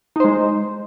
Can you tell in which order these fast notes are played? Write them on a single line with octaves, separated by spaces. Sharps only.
D#4 C5 G#3